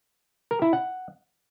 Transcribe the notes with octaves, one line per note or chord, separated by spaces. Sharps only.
A#4
E4
F#5